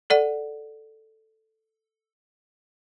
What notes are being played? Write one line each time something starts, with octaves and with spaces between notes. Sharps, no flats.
A4 D5 F#5